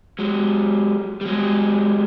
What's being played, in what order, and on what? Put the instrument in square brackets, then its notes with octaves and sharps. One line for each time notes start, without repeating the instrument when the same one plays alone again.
[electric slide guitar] F#3 G#3
G3
F#3 G#3